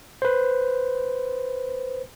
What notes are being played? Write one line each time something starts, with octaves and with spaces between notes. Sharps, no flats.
B4 C5